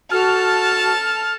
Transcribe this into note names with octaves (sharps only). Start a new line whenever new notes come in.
F#4 A4 A5 F6